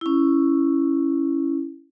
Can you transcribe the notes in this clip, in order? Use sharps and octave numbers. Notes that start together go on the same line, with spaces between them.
C#4 E4